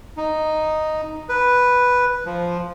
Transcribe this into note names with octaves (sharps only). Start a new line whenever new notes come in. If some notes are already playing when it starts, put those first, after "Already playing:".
D#4
B4
F3